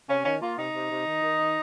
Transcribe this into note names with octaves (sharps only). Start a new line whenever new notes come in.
C3 C#4
D#3 C#4
A#3 F4
C3 D#4
C3
C3
D#3
D#3
D#3